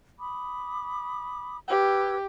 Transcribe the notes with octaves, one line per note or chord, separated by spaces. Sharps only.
B5 D6 D#6
G4 B4 E6 G#6